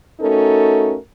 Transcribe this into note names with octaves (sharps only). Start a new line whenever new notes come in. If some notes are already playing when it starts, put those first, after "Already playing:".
A3 C#4 D#4 F#4 A4 A#4